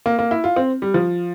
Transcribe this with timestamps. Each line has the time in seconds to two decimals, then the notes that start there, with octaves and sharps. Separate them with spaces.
0.06 A#3
0.19 A#3
0.31 E4
0.44 F4
0.56 C4
0.82 G3
0.94 F3